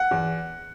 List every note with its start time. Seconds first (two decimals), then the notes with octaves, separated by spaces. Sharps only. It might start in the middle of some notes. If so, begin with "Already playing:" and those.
Already playing: F#5
0.11 E2